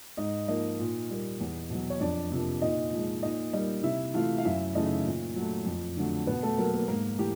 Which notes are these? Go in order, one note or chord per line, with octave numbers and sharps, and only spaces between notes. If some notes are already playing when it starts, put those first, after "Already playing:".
G#2 D#4 D#5
F3 A#3 D#4 D#5
A#2
G3 A#3
E2
B2 F#3
C#5
F2 D4 D5
C3 F3 A#3
A#2 D#4 D#5
F3 G#3
A#2 D#4 D#5
G3 A#3 D#4 D#5
C3 E4 E5
E3 A3 F4 F5
F5
F#2 E4 E5
C#3 E3 A3 D#4 D#5
A#2
F#3 A3
F2
D3 F#3 A3
B2 B3 B4
A3 A4
F#3 A#3 A#4
A#3 A#4
G#2 A#3 A#4
E3 A3 G4